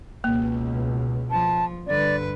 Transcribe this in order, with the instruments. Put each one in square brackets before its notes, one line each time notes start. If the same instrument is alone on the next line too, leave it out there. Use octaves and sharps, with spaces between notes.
[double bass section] C#2 B2 [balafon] A#3
[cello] F3 [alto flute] A5
[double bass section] G2 [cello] D3 B4 [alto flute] D5